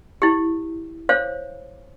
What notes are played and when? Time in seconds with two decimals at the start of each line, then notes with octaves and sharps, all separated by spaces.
0.22 E4 G4
1.09 C5 C#5 F5